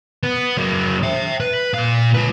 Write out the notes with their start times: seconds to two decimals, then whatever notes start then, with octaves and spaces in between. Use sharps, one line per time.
0.23 B3
0.57 F#3 A#3
1.03 E5 G5
1.40 B4
1.74 A#2 F5
2.14 F4 B4